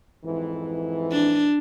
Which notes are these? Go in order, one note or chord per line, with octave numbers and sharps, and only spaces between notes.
F2 G#2 E3
D4